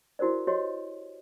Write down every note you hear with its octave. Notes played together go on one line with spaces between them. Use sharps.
E4 F#4 A#4 C5 D5
F#4 G4 C#5 D#5